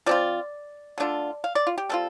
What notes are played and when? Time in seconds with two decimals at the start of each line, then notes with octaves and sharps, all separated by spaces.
0.06 F3 C4 F4 D5
0.98 D3 A3 D4 F4
1.44 F5
1.55 D5
1.67 F4
1.78 G4
1.89 G3 C4 F4 A4